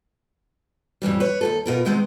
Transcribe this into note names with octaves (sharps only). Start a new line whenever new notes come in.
F2 A2 E3 G3
B4 C#5
D#2 G#2 A4
B2 F4 A#4
C3 D#3 G#3 B3 C4